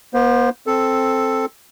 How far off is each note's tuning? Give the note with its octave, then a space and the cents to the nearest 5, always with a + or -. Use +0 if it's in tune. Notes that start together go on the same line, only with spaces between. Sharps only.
B3 -40 C5 +0
C4 +5 A4 +0